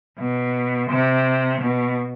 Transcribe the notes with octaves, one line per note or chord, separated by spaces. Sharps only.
B2
C3
B2